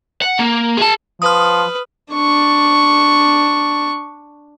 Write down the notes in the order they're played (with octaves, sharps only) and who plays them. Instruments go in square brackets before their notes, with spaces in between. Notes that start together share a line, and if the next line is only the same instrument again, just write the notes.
[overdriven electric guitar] F#5
A#3
G#4 A5
[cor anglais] F3 [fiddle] B4 [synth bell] D#6 F6
[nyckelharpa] D4 C#6